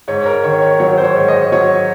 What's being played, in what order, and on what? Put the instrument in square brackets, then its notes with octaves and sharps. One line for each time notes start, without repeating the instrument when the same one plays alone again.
[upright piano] G#2 C#5
A#4
D#3 C#5
C#5
F#3 C#5
C5
C#5
G#2
D#5
F#3 C#5